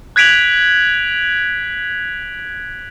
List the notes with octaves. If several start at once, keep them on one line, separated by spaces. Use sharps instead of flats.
F#6 G#6 B6 D7 F7 F#7